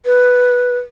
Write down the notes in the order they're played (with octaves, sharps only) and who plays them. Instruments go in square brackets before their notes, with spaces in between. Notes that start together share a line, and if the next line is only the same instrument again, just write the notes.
[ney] B4